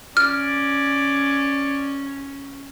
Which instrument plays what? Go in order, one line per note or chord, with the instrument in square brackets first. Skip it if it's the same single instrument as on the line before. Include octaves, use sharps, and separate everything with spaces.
[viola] C#4 [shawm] D5 [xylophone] F6